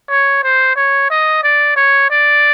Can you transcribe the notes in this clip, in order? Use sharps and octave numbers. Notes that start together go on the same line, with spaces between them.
C#5
C5
C#5
D#5
D5
C#5
D5